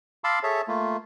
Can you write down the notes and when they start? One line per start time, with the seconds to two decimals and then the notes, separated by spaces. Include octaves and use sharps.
0.24 F5 A5 B5 C6 D6 E6
0.43 G#4 A4 C#5 E5 A5
0.68 A3 A#3 F4